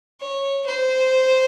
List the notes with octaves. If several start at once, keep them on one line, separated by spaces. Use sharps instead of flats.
C#5
C5